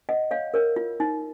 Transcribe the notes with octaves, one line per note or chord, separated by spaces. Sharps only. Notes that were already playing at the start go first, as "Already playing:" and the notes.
D#5 F#5
C#5 F5
A#4 C#5
F4
D#4